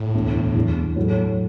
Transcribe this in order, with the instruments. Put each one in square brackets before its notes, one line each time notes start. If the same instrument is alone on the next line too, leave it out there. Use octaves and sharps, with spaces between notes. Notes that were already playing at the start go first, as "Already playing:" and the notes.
Already playing: [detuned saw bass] A2
[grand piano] E1 D2 D3 B3 E4
E2 E3 B3
A2 F#3 A3